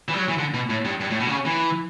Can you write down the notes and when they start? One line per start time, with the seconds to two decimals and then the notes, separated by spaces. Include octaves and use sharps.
0.08 E3
0.14 G3
0.18 F#3
0.28 E3
0.39 D3
0.54 B2
0.70 A2
0.85 G2
1.00 G2
1.11 A2
1.20 B2
1.27 D3
1.30 C#3
1.46 E3